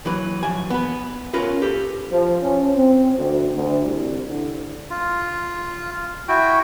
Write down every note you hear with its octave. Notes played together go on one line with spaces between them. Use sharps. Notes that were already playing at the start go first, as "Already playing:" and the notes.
D#2 E3 F#3 B4
F#2 F3 G#5
B3 B4
C#4 F4 A#4 B4 F5
G4 A4
F3
C#4
C4
D2
D2
C2
D3
F4
E4 F#4 G5